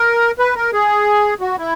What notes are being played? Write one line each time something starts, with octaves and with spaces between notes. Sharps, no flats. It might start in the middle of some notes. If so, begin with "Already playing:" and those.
Already playing: A#4
B4
A#4
G#4
F#4
E4